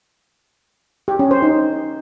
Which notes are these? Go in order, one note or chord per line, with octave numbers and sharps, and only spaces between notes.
G4
C#4
C5
D#4